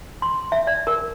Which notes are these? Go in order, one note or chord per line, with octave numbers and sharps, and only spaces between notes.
C6
E5
D5
A#4